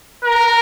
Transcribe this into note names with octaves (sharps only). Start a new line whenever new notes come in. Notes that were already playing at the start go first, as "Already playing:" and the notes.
A#4